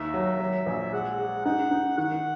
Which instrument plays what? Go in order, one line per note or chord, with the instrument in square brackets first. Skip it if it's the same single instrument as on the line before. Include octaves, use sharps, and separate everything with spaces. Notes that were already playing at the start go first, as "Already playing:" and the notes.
Already playing: [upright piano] D#2 D#3 [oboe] E5
[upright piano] F#3
F#3
A#1
[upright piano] G#3 [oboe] F#5
[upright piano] G#3
[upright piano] D#4 [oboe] F#5
[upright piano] D#4
[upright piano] D#3 [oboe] F#5